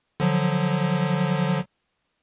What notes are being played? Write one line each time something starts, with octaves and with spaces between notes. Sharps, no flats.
D3 F3 F#3